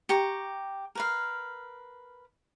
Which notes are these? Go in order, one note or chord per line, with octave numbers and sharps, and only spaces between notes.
G4 A#5 C#6
A#4 B4 F5